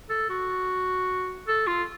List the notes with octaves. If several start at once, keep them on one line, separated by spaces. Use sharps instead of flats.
A4
F#4
A4
F4